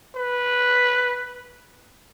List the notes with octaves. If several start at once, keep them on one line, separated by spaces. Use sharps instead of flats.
B4